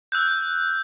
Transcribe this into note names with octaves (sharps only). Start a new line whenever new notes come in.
E6 F#6 G6